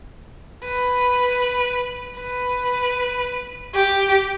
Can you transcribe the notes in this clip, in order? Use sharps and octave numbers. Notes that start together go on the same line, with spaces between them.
B4
B4
G4